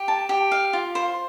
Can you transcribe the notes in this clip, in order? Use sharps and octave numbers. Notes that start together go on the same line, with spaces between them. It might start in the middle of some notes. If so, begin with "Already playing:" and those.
Already playing: G4
A5
G4
F5
F4
C5